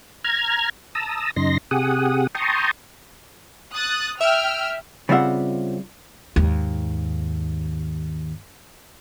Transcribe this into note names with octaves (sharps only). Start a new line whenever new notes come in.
A#5 F6 G#6
A5 A#5 D#6 E6
F#2 C#3 D#4 C6 A#6
C3 G4 G#4 F#5 D#6
G5 A5 A#5 C6 C#6 D#6
D#6 F#6 A6
E5 G5 E6 F6
C#3 G3 C4 F4 E5 F#5
D#2 G#2